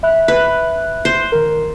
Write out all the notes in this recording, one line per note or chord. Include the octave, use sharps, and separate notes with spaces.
E5 B5 F#6
B4
C5
D#3 A#4